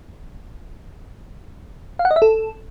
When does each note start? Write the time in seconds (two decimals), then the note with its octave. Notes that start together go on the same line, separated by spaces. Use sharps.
1.99 F5
2.05 F#5
2.11 D#5
2.16 E5
2.22 A4